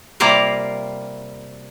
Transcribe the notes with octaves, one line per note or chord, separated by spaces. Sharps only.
C3 G3 A#3 F4 A#4 F5